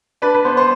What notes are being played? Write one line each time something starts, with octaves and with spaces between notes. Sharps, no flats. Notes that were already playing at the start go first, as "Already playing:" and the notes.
D4 B4
B4
B3 C5
C5